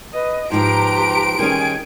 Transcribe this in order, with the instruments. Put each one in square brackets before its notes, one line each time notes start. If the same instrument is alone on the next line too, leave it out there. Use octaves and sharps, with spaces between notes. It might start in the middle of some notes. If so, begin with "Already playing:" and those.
[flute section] B4 [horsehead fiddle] D#5
[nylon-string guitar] G#2 F3 [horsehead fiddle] G4 A#5 [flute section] B4 A5 C6 [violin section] D7
[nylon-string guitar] D#3 G3 C#4 [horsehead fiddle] G#4 G#5